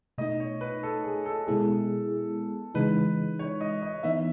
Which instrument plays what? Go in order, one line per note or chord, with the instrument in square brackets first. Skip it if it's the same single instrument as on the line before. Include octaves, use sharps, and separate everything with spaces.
[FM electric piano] B2 A3 D#4 [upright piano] D#5
[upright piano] C#5
B4
A4
G#4
A4
[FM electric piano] B2 G#3 B3 E4 G#4 [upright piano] A4
[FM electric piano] C#3 E3 G#3 D#4 [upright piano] B4
[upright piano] C#5
D#5
D#5
[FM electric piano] E3 B3 D#4 [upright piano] E5